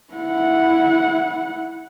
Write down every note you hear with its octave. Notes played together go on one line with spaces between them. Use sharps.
E4 F#5